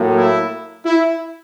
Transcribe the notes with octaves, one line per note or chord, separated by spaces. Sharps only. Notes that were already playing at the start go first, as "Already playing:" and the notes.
Already playing: A2 F#3 A#3
E4
E4